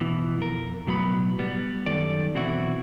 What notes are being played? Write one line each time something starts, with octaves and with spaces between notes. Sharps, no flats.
B2 E3
F2 A#4
B1 A2 F#3 B3 B5
G3 B3
F#2 D#3 A4 D5
B1 B2 E3 C4 E4 F#4